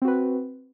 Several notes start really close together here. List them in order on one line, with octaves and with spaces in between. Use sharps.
C4 F#4 B4